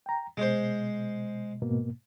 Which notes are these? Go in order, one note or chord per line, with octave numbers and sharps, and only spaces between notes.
G5 A#5
B2 G#3 C5
G#2 B2 A#3